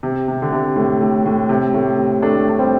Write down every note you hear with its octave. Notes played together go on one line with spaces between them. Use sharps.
C3
C3
D3
C3
A2
A2
A2
C3
A2
C3
A3 D4
D4
G3 C4